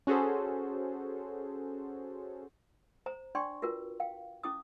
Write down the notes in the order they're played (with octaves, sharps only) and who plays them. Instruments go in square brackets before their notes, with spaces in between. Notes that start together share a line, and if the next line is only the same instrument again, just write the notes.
[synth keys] C#4 F#4 G#4 A4 C5
[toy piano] C5 A#5
D4 D5 G5 C6 C#6
F4 F#4 A#4 B4
F5 G5
C#4 E4 D6 D#6